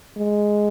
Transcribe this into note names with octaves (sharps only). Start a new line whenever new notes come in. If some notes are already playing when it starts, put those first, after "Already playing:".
G#3